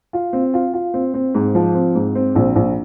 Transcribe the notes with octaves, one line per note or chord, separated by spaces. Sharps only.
F4
C4
F4
F4
C4
C4
G#2
F3
C4
G#2
C4
A#1
A#1